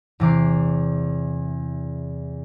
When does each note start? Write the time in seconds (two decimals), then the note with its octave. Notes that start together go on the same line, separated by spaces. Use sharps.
0.20 E2 C3 D6 C7